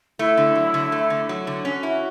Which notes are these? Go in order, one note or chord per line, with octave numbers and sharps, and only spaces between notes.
A3 E4
D3
F#3
D3
A3
D3
F#3
D3
C#4 F#4
E4